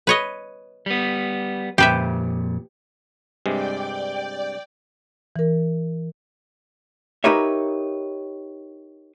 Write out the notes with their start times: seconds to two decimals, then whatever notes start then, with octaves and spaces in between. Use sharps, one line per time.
0.07 B4 C#5 D#5
0.86 G3 B3
1.78 F2 A#2 G4 B4 E5
3.46 G2 C3 G#3 D5 G5
5.36 E3 A#4
7.24 D#4 G4 A#4 B4 C#5 E5